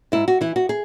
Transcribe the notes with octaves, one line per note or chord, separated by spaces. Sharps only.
G#2 E4
F#4
E3 E4
F#4
G#4